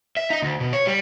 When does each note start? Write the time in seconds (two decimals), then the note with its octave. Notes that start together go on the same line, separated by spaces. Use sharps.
0.17 E5
0.30 D#4
0.42 D2
0.60 B2
0.73 C#5
0.87 G3